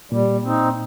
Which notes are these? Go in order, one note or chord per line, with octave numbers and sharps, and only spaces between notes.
A#2 G3
C4 D#4